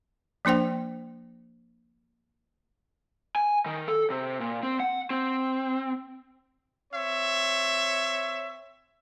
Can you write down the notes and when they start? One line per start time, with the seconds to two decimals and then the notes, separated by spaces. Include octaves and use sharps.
0.45 F3 A#3 D4 C5 G5
3.36 G#5
3.66 D#3
3.88 A4
4.10 C3
4.40 A#2
4.63 C4
4.80 F#5
5.10 C4
6.94 C4 C#5 E5